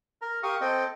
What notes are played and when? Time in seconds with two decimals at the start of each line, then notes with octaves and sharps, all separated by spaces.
0.22 A#4 A#5
0.43 G4 A#4 F5 C#6 D#6
0.61 C4 A4 D#5 G5